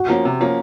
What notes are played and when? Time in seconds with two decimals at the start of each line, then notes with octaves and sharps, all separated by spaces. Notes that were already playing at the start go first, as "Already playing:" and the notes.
Already playing: F#4
0.09 F3 A#3 C#4
0.25 C3
0.40 F3 A#3 C#4